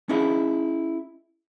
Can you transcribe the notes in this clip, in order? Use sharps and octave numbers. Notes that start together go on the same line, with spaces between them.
C#4 D#4 E4 G#4